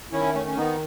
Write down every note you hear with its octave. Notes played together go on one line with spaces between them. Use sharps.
D#3 C#4 E4
A3 C#4
C#4
D#3 B3 D#4